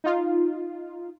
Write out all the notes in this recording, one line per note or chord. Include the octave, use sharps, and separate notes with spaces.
D#4 F4